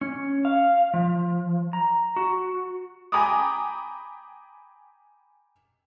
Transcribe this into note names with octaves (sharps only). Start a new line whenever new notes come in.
C#4
F5
F3
A#5
F#4
G5 G#5 A#5 B5 D6 D#6